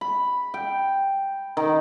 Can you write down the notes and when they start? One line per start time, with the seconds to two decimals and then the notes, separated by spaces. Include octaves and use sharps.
0.01 B5
0.54 G5
1.57 D#3